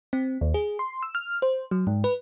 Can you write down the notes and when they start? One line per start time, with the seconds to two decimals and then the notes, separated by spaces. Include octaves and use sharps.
0.13 C4
0.41 D#2
0.54 G#4
0.79 C6
1.03 E6
1.15 F6
1.42 C5
1.71 F#3
1.87 G#2
2.04 B4